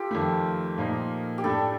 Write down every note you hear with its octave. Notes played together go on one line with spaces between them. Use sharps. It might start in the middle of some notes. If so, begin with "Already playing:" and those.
Already playing: F4 G4 A4
F2 D#3 A3
A#2 F3 A#3 D#4
G4
A2 A3 D4 A4